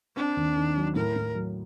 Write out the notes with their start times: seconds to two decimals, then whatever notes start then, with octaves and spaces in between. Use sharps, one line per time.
0.16 C4 D4
0.37 D#2
0.56 D#3
0.76 F#3
0.96 A2 A#4
1.16 A2
1.35 F#3